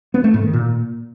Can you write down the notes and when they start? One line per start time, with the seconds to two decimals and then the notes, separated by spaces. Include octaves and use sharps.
0.14 B3
0.24 A3
0.34 G#2
0.44 D#3
0.53 A#2